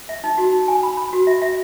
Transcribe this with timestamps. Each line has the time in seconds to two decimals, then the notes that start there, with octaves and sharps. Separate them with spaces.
0.09 E5
0.24 D#4
0.38 F#4
0.53 D#4
0.68 G#5
0.83 B5
0.97 B5
1.13 F#4
1.27 E5
1.42 E5